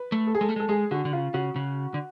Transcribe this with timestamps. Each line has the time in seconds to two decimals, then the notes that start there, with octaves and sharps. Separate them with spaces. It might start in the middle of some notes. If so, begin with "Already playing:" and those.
Already playing: B4
0.12 A3
0.27 A4
0.35 G#4
0.41 G#3 A4
0.49 A3
0.56 G#3 A4
0.69 G#3 G#4
0.91 D3 F#4
1.05 D3
1.12 C#3 F4
1.34 C#3 F#4
1.56 C#3
1.94 D3